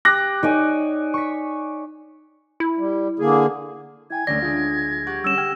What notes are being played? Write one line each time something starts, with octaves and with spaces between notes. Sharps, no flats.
G4 D6 F#6 A#6
D#4 C#5 D5 G#5
C#6 B6
E4
G3
D3 A#3 G#4
E4 G5 G#5 G#6
D2 D3 F#3 A3 C#4 D5 A#6
G#3 F4 G5
G4 F#5 C#6
G3 C#4 E6 E7
G5 F6 G#6